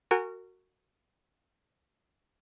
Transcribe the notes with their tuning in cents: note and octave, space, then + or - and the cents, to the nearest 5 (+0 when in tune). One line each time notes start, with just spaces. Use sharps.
F#4 +0 A#4 -30 G#5 -20